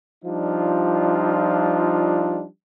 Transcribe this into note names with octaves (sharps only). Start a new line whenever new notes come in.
F3 G3 D4 D#4 F4